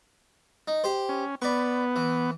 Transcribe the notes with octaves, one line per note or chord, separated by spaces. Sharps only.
D#4
G4 C5
C#4
B3 D5 B5 C#6
E3